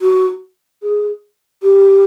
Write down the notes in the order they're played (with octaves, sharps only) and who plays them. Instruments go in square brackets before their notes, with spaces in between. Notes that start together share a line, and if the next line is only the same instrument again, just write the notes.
[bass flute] F#4
G#4
G4